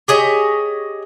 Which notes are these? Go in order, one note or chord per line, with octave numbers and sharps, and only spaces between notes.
G4 G#4 C#5 D#5